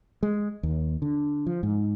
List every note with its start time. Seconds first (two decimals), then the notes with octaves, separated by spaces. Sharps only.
0.23 G#3
0.63 D#2
1.02 D3
1.46 F3
1.63 G#2